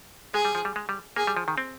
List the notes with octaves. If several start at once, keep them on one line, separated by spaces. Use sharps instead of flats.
G#3 G#4
G3
F3
G3
G#3
G3
A#3 G#4
G3
F3
D#3
C4